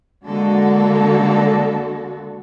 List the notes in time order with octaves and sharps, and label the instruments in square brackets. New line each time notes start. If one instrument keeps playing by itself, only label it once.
[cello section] D3 G#3 A#3 F#4 A4